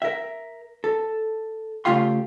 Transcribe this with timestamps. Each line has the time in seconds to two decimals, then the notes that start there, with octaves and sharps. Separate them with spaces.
0.02 A#4 E5
0.84 A4
1.85 C#3 A3 F4 G4 F5 C6